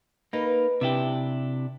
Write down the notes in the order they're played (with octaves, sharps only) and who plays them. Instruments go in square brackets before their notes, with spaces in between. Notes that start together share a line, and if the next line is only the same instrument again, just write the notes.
[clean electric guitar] A#3 D#4 [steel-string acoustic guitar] B4
[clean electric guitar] C3 E4 G4 [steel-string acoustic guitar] D4